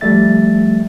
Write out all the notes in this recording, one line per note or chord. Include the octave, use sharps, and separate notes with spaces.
F3 G3 A3 E5 A6